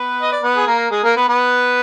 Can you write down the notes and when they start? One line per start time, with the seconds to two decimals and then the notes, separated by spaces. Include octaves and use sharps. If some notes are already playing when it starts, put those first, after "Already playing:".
Already playing: B3 B4
0.22 D#5
0.32 D5
0.43 B3 B4
0.56 G#4
0.67 A#3 A#4
0.91 G#3 G#4
1.04 A#3 A#4
1.16 B3 B4
1.28 B3 B4